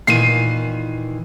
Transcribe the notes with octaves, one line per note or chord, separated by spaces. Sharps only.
A#2 D#3 E3 C7 D#7